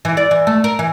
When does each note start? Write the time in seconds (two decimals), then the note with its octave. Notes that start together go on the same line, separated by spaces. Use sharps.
0.05 E3
0.17 D5
0.31 E3
0.47 A3
0.64 A#4
0.79 E3